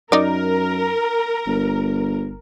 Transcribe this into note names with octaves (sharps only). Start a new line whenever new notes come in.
F#2 D#4 A#4 D5
G1